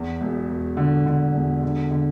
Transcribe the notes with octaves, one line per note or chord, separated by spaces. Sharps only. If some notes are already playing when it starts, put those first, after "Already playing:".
Already playing: E2
E1
E1
D3
D3
E1
D3
D3